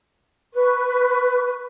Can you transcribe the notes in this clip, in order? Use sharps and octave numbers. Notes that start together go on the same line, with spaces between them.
B4 C#6